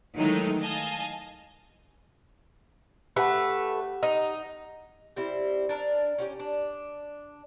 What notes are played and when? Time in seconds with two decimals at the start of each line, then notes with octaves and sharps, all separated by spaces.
0.16 D#3 E3 F#3 G#3 A3 D#4
0.61 D#5 F5 G#5 A5
3.16 A3 G4 B4 F#5
4.03 D#4
5.16 G3 C4 E4
5.69 D4 A#4
6.18 C#4 F#4 G4
6.40 D4